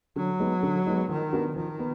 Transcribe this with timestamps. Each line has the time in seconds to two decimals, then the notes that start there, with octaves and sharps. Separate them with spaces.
0.16 D3 F#3
0.40 G#3 B3 D#4
0.63 D3
0.86 G#3 B3 D#4
1.09 D#3 F3
1.33 B3 D4 F#4 A#4
1.56 D#3 F3
1.79 B3